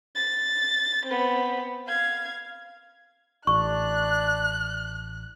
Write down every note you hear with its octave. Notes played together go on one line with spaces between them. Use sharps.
A6
B3 C4
F5 G#6
A1 D4 C#6 F#6